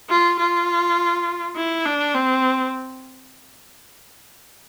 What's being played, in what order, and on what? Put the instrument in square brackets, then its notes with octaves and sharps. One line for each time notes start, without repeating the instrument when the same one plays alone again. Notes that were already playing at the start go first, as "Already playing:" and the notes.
[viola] F4
F4
E4
D4
C4